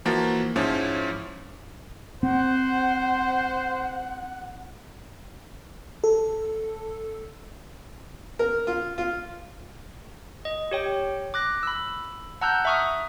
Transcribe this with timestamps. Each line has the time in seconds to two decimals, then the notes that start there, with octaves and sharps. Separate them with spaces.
0.05 E3 F3 A#3 F#4 A#5 A6
0.56 G#2 F3 C#4 E4
2.23 C4 C5 F#5
6.04 A4
8.39 A#4
8.67 F4
8.98 F4
10.45 D#5
10.71 G4 C#5 G5
11.34 D6 F#6 A#6
11.63 B5 E6
12.41 F#5 A5 A#5 E6 F#6 G6
12.65 E5 A#5 C#6 D#6 F6